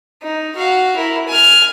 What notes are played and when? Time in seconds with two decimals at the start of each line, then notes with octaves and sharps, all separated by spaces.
0.22 D#4
0.56 F#4 F5
0.96 E4 A#4
1.28 G#5 F6